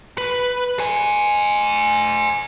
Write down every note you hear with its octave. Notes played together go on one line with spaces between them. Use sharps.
B4
C5 G#5